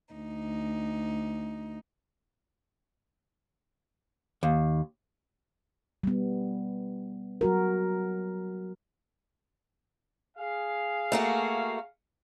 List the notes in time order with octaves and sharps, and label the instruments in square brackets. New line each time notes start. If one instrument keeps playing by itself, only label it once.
[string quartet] D2 D#4
[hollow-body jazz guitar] D#2
[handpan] G3 B3
F#3 F#4 A#4
[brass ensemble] G#4 F5
[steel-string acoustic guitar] A3 A#3 F#4